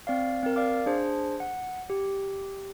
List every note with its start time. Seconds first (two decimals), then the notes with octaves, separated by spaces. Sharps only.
0.07 C4 D5 F5
0.43 C4 A#4
0.56 D5 F5 D6
0.86 D4 G#4 C5
1.40 F#5
1.90 G4